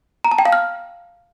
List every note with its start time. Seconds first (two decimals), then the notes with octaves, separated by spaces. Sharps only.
0.24 A#5
0.31 A5
0.38 G5
0.45 F5
0.52 F6